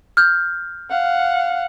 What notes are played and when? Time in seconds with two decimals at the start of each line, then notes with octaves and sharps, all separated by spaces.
0.17 F6 G6
0.90 F5 F#5